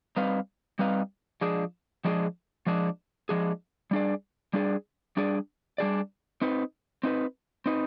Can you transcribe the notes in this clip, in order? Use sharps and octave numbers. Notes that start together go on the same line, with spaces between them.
G3 C4 D#4 B4 F5
G3 C4 D#4 B4 F5
F3 G#3 D4 G#4
F3 G#3 D4 G#4
F3 G#3 D4 G#4
F3 G#3 D4 G#4
G3 D4 G#4 D5
G3 D4 G#4 D5
G3 D4 G#4 D5
G3 D4 G#4 D5
C4 D#4 B4
C4 D#4 B4
C4 D#4 B4